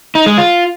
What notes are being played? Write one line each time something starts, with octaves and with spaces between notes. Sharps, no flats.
D#4
G#3
F4